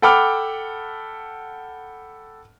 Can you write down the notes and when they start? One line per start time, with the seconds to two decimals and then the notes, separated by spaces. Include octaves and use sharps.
0.02 A4 F#5 G5 B5 D6 F6